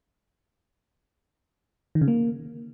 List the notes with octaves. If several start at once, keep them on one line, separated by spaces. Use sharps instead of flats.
D#3
C#3
A#3